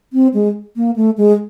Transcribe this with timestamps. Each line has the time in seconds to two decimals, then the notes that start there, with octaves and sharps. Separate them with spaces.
0.13 C4
0.34 G#3
0.76 A#3
0.96 A3
1.18 G#3